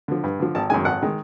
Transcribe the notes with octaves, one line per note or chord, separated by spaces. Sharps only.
D3 F3
G2
D3 F3
G#1 A5
F#2 D#3 G#3 G#5
G#1 F#5
D#3 G#3